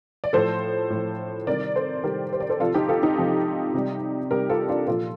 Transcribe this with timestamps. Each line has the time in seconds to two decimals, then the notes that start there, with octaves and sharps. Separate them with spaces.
0.24 D5
0.33 A2 F3 A4 C5
0.90 A2 F3
1.47 C3 D#3 G3 A#4 D5
1.76 A4 C5
2.03 C3 D#3 G3 G4 A#4
2.33 C5
2.40 D5
2.49 A4 C5
2.60 C3 F3 F4 A4
2.74 D#4 G4
2.89 F4 A4
3.03 D#4 G4
3.18 C3 F3
3.74 C3 G3
4.31 C3 G3 G4 A#4
4.50 F4 A4
4.69 D4 F4
4.87 A#2 F3 F4 A4